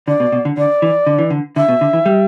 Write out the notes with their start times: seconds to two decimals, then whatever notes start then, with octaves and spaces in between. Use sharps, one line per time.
0.08 D3 D5
0.20 B2
0.32 B2
0.45 D3
0.57 D3 D5
0.82 E3
1.07 D3
1.19 E3
1.30 D3
1.56 D3 E5
1.68 B2
1.81 D3
1.93 E3
2.06 G3